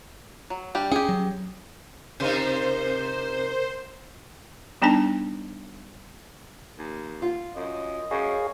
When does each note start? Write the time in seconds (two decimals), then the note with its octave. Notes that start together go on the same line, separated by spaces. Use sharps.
0.50 F#3
0.75 G3 D4 G4
0.92 C#4 G4 G#4
1.09 F#3
2.20 C3 D#4 A#4 C5
4.82 G3 B3 D4 D#4 A5
6.78 D#2
7.22 F4
7.56 F#2 D#5
8.11 F#2 G#4 C#5 F5